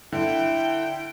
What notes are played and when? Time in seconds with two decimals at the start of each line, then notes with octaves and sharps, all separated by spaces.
0.12 D3 E4 G5